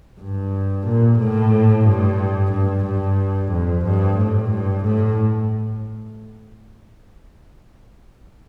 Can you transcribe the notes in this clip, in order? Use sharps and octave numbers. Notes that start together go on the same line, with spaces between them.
G2
A#2
A2
G2
G2
G2
F2
G2
A2
G2
A2